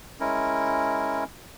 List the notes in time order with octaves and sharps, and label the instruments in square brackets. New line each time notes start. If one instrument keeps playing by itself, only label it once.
[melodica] G#3 C#4 E4 A#4